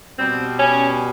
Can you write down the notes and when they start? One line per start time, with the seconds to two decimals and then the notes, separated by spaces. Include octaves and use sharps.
0.18 B2 G3 C4
0.59 C#4